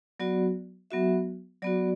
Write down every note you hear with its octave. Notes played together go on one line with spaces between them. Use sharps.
F#3 B3 F#4 D5
F#3 B3 F#4 E5
F#3 B3 F#4 D5